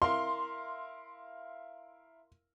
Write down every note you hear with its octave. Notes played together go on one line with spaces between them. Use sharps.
E4 A#4 F5 C6